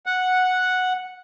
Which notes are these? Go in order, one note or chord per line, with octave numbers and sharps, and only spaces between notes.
F#5